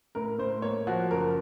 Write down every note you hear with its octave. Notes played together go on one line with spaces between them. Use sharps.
A2 A#4
A2 C5
A#3 C#5
F3 F#4
F#1 A#4